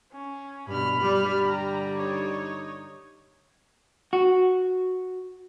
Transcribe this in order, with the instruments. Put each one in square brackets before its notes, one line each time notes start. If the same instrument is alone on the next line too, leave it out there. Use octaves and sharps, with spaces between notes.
[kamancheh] C#4
[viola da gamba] G2 B2 [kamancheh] B5 F6
[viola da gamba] G2 G3
[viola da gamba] D3 G3 [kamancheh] G4 A#5
[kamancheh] D#4 C#5
[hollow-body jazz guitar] F#4